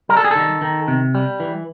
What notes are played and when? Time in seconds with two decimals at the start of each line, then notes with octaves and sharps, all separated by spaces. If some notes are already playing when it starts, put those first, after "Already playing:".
0.09 G3 A#4
0.17 A4
0.25 G#4
0.31 D#3 A4
0.61 D#3
0.88 C3
1.15 G3
1.40 E3